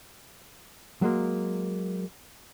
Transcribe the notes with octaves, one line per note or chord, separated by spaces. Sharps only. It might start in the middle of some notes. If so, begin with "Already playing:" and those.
F#3 G#3 A#3